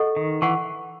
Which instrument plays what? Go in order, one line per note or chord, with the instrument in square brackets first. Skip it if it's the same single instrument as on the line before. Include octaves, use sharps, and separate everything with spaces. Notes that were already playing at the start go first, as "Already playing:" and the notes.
Already playing: [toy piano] A4 D#5 F#5 C#6
[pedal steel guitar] D#3
[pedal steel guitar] E3 [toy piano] F#5 C#6